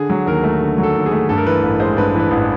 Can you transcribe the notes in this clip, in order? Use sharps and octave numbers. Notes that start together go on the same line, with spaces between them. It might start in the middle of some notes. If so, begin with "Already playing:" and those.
Already playing: D3 G#4
F#3
D#2 A#4
A3
D3
F#3
A4
D#2
G#4
A3
G2 A4
A#4
E3 B4
A1 A#4
G#3 C5
G2 B4
E3
B4
A1